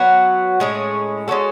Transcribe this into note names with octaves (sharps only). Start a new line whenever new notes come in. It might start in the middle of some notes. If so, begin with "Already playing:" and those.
Already playing: F#3 B3 F#4
A2 G#3 C#4 G#4
G#3 C#4 F#4 A4